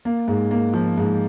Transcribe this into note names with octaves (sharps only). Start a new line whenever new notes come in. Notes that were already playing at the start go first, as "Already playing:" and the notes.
A#3
G#2
A#3
F3
G#2